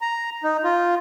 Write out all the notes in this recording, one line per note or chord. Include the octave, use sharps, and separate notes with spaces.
A#5
D#4
F4